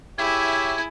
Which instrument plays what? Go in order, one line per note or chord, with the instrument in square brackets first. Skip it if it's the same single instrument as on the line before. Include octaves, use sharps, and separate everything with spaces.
[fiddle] E4 G#4 [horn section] G4 C#5 E5 [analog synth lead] G#6